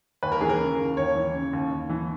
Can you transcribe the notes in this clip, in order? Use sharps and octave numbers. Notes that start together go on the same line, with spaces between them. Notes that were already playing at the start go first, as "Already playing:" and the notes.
D#2 B4
A#4
E3 G#4
A#4
C#3
D#2
D#2 C#5
E3
C#3
D#2
D#2
E3